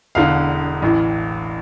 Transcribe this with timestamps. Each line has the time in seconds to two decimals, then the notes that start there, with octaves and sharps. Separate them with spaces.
0.15 E1 E2 D3 F5
0.82 A1 A2 E3